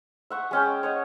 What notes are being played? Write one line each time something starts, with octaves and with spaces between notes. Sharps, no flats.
E5 F#5 C#6
G#3 C#4 G5
C#5 D#5 F#5